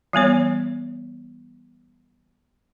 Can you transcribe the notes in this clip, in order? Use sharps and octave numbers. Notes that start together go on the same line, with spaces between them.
E3 G3 B3 C#5